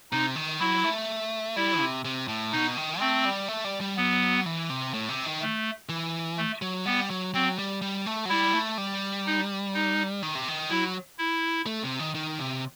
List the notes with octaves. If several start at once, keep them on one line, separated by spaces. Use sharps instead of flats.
C3 D#4
D#3
F#3 E4
A3
G3 E4
C3
C3
A2
B2 D#4
D#3
A3 C4
G3
A3
G3
G3
F#3 B3
E3
C3
A2
C3
D#3
A3
E3
A3
F#3
G3 B3
F#3
F#3 C4
G3
G3
A3
F#3
G3 E4
A3
G3
D#4
D#4
D#3
C3
D#3
F#3 E4
E4
A3
C3
D#3
D#3
C3